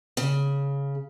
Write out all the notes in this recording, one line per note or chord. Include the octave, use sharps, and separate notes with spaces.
C#3